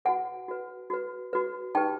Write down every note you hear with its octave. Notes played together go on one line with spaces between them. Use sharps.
F#4 B4 F#5 G#5
F#4 B4
F#4 B4
F#4 B4
D#4 G4 B4 G5 A5